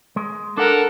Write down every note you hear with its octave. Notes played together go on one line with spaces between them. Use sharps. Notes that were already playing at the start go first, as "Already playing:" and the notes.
G#3
D4 A4 A#4 F#5